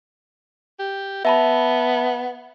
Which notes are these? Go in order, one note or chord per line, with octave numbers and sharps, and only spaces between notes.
G4
B3 E5 A5 B5